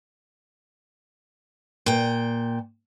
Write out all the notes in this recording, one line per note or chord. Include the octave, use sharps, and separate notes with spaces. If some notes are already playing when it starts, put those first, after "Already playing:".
A#2 G5